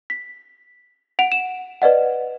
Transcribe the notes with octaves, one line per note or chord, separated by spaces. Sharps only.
B6
F#5 D7 F7
E7
B4 D5 D#5 F#5